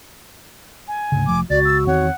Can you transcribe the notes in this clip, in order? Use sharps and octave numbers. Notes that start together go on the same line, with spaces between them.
G#5
D2 G#2 C#3
F1 F3 A3 D6
C#2 F#4 D5 A6
E6
E2 D#3 C4 C#5 F#5